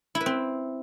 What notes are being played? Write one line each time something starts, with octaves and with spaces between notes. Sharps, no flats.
E4
B4
C4